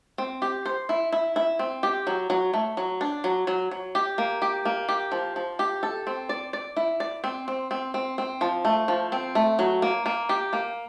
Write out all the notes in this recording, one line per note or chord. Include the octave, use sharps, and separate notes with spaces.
C4
G4
C5
E4
E4
E4
C4
G4
F#3
F#3
A3
F#3
D4
F#3
F#3
F#3
G4
A#3
G4
A#3
G4
F3
F3
G4
A4
C4
D5
D5
E4
D5
C4
C4
C4
C4
C4
F3
A3
F3
C4
A3
F#3
A#3
A#3
G4
A#3